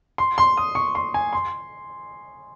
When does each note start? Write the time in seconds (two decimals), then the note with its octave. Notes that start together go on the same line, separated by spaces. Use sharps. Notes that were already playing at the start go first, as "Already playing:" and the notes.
0.18 C6
0.38 C6
0.57 D#6
0.75 C#6
0.95 C6
1.14 G#5
1.33 C6